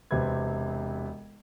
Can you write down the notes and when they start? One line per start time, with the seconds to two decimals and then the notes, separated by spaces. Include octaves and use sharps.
0.11 E1 C3 C4 G4 B4 G#6